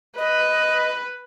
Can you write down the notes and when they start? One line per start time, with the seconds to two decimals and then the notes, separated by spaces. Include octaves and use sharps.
0.18 B4 D#5